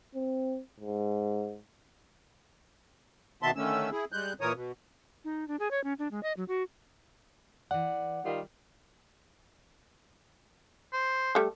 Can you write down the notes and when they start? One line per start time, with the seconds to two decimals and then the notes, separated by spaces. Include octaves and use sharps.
0.15 C4
0.80 G#2
3.43 B2 D#3 B3 E5 A5 C6
3.56 D3 D#3 A3 C#4 E6
3.91 E4 G#4
4.12 G3 G#3 F#6 G6
4.41 A#2 E3 A#4 C#5 D#6
4.55 B2
5.25 D#4
5.48 D4
5.60 G#4
5.71 C#5
5.84 C#4
5.99 D4
6.11 G#3
6.23 D#5
6.37 F#3
6.48 F#4
7.71 E3 D5 F#5
8.24 D#3 G3 F4
10.93 C5
11.35 G3 A3